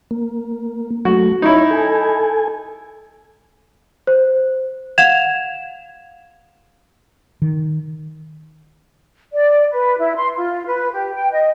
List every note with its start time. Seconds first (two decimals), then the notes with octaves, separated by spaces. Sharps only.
0.11 A#3
1.05 F#3 A3 F#4
1.42 D#4 E4 C#5
1.71 A4 G#5
4.07 C5
4.98 F5 F#5 G#6 E7 F7
7.42 D#3
9.33 D5
9.72 B4
9.99 E4
10.16 C6
10.36 F4
10.66 B4
10.92 G4
11.14 G5
11.32 D#5